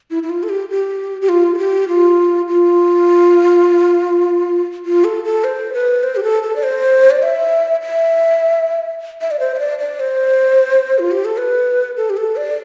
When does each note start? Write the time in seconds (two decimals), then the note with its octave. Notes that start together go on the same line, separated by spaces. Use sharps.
0.11 E4
0.23 E4
0.30 F4
0.43 A4
0.49 G4
0.70 G4
1.21 G4
1.29 F4
1.54 A4
1.58 G4
1.88 F4
2.48 F4
4.85 F4
5.04 A4
5.24 A4
5.44 C5
5.73 B4
6.03 C5
6.16 G4
6.23 A4
6.43 A4
6.56 D5
6.63 C5
7.11 D5
7.23 E5
7.82 E5
9.21 E5
9.31 D5
9.40 C5
9.54 E5
9.59 D5
9.79 D5
10.00 C5
10.99 F4
11.11 G4
11.25 A4
11.37 B4
11.97 A4
12.10 G4
12.17 A4
12.36 D5